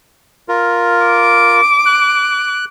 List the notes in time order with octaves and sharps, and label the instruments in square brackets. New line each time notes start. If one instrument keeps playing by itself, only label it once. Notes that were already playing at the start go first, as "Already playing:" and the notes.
[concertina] F4 A#4
[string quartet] D6
[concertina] F#6